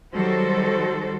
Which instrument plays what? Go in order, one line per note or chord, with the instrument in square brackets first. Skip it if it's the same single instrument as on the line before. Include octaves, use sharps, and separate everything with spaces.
[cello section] D#3 F#3 G3 F#4 A4 C5